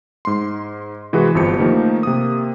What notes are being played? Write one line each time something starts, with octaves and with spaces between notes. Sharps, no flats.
G#2 C6
C3 E3 G#3 F#4 G#4 B4
G1 F2 F3 G4 C#7
D#3 F3 A3 A#3 D#4
C3 A#3 D#6